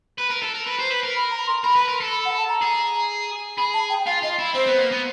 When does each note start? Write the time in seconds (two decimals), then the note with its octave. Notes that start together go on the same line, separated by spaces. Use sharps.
0.18 B4
0.30 A#4
0.43 A4
0.55 A#4
0.67 B4
0.79 C5
0.91 B4
1.03 A#4
1.16 B5
1.31 A#5
1.47 C6
1.64 A#4 B5
1.76 B4
1.88 A#4
2.01 A4
2.12 B5
2.25 F#5
2.37 A5
2.49 A#5
2.61 G#4
3.57 G#4 B5
3.74 A5
3.90 G5
4.06 F4 F5
4.23 F4 D#5
4.39 E4
4.54 C4 C5
4.67 B3
4.79 A#3
4.92 B3